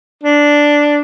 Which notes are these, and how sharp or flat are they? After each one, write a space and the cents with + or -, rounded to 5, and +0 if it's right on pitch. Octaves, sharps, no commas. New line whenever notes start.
D4 -5